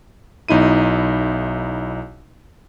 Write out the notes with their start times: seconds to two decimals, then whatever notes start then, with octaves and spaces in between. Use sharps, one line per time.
0.48 B1 D#4 E4 D#7